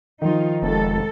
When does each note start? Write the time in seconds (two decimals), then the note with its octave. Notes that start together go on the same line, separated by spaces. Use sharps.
0.22 D#3 F3 D#4 F4
0.62 F1 G#3 A4